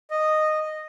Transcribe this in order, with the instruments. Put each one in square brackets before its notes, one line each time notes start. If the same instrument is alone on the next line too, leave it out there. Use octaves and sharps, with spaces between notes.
[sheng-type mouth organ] D#5